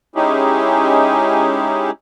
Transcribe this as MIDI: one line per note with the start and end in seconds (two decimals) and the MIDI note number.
0.16 1.91 56
0.16 1.91 61
0.16 1.91 63
0.16 1.91 64
0.16 1.91 67
0.16 1.91 68